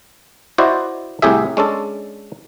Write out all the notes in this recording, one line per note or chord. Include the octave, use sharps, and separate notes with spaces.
E4 F#4 C5 D5 D#5
C2 A2 G4 G#4 E5
G#3 C#4 D4 A4